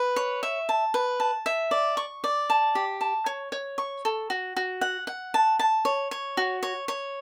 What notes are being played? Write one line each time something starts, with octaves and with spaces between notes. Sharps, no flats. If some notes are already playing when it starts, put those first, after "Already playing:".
Already playing: B4
C#5
E5
A5
B4
A5
E5
D5
C#6
D5
A5
G4
A5
C#5
C#5
C#6
A4
F#4
F#4
F#5
F#5
A5
A5
C#5
C#5
F#4
C#5
C#5